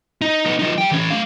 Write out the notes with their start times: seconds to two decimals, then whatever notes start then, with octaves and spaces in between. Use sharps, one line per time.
0.21 D#4
0.46 B3 D#4
0.59 F3 D#4
0.78 G3 G5
0.92 E3 C#4
1.10 A3 F5